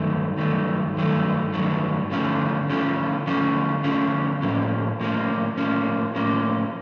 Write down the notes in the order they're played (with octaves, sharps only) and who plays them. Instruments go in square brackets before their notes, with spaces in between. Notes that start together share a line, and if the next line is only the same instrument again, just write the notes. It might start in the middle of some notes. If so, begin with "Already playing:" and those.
Already playing: [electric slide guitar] G2 D#3 F#3 A3
G2 D#3 F#3 A3
G2 D#3 F#3 A3
G2 D#3 F#3 A3
D3 F3 A3 C#4 F4
D3 F3 A3 C#4 F4
D3 F3 A3 C#4 F4
D3 F3 A3 C#4 F4
A2 F3 A#3 C#4
A2 F3 A#3 C#4
A2 F3 A#3 C#4
A2 F3 A#3 C#4